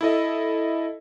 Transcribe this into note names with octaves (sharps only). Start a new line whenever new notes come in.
E4 A4 D#5